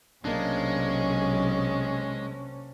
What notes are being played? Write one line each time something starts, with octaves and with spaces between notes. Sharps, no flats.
B1 C3 G#3 A#3 C#4 D4